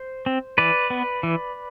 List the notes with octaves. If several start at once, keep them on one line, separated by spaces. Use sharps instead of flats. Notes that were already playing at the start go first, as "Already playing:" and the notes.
Already playing: C5
C4
E3 B4 D5
B3
E3